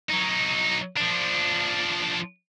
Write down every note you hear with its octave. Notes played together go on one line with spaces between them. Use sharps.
F#3 D#4
F3 D4